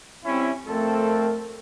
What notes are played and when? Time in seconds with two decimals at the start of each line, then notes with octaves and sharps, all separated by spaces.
0.24 G3 C4 C#4 E4
0.67 F2 A3 C4 A4 A#4